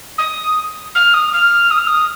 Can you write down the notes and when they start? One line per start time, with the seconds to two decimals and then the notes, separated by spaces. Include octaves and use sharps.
0.18 D#6
0.95 F6
1.13 D#6
1.32 F6
1.70 D#6
1.78 F6
1.86 D#6